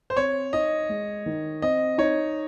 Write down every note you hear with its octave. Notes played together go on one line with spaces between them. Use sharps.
C5
C4 C#5
D#4 D#5
G#3
D#3
C4 D#5
D#4 C#5